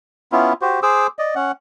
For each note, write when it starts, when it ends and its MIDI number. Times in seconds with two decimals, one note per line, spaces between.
0.32 0.53 59
0.32 0.53 61
0.32 0.53 64
0.32 0.53 65
0.62 0.80 66
0.62 0.80 67
0.62 0.80 72
0.83 1.07 68
0.83 1.07 72
0.83 1.07 86
0.83 1.07 88
1.19 1.35 74
1.19 1.35 75
1.35 1.52 61
1.35 1.52 78